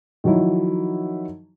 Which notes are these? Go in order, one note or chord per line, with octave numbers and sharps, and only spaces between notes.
D#3 F3 F#3 D#4 E4